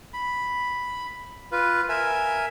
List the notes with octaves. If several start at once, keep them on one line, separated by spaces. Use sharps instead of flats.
B5
F4 B4
A#4 E5 G#5